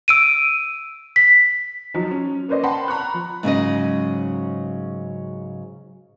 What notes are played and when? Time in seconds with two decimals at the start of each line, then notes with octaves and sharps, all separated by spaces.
0.08 E6 D7 D#7
1.16 B6
1.94 F3 F#3 D#4
2.11 C#4
2.48 A#3 C#4 B4 C5 D5 D#5
2.63 F#5 G5 A5 B5 C6
2.88 A#5 B5 C#6 F#6
3.14 F3
3.43 G#2 C#3 F#3 D#5